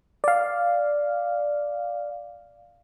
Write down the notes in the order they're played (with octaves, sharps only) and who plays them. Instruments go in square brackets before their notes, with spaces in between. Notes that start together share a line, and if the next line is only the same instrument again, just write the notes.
[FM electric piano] D5 F5